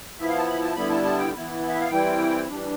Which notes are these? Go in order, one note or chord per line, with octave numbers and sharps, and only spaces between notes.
F3 B3 E4 E5
F5
A5
B5
A5
D3 G3 B3 E4 B5
A5
A5
G5
E3 B3 E4
E5
F5
E3 G3 C4 E4 G5
E3 G3 D4